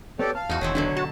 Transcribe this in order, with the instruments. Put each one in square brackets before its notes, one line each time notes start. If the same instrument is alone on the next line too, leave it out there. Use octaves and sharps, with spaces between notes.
[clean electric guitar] B3 C#5 [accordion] G4 A4 D5
[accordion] F5 [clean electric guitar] A5
[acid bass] E2 [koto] D#4 F#4
[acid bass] E1 [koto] D#3 E3 C4 [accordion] C#5
[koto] B2 D3 F#3 [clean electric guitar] D4
[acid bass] F#4 [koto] A5